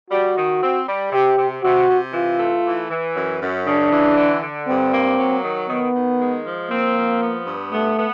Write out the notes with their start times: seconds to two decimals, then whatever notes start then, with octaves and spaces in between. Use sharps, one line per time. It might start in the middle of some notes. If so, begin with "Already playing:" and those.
0.11 G3 F#4
0.36 D#3
0.62 C4
0.87 G3
1.12 C3 G4
1.37 C3
1.63 C3 F#4
1.89 C3
2.13 E3 F4
2.39 A3
2.65 E3
2.91 E3
3.15 F#2
3.41 F#2
3.66 C#3 D4
3.91 E3
4.18 D3
4.43 D3
4.67 G2 C4
4.93 A#3
5.18 F#3
5.43 D#3
5.69 D#3 B3
5.94 D#3
6.19 G#3
6.45 F3
6.70 A#3 C4
6.96 F3
7.21 B3
7.46 G2
7.72 A3 B3
7.98 B3